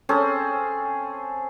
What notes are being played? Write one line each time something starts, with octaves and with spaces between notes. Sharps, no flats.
C4 C#4 G#4 A4